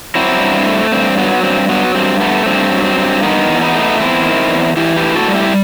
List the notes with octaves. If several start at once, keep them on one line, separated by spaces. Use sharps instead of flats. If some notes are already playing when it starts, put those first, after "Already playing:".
F#3 C4 E4
G2
A3
G2 C4
F#3 B3
G2 C4
F#3 B3
G2 C4
A3 B3
G2 C4
F#3
C4
G2
D#3 B3 D#4
E2
B3 D#4
A3
E2 C4 E4
D#3
E2
E3 E4 G4
G4 B4
A2
F#4 A4
G3
E4 G4